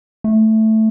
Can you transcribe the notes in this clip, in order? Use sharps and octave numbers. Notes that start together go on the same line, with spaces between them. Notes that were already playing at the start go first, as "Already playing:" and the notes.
A3